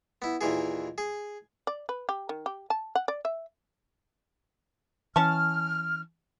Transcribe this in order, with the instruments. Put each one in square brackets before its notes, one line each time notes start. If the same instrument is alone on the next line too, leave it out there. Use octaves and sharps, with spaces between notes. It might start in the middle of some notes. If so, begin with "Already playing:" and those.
[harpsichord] B3 E4
D#2 A#2 E3 G#4
G#4
[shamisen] D5
B4
G4
D#3
G4
A5
F#5
D5
E5
[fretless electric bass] E3 [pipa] C#4 A5 C#6 [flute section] F6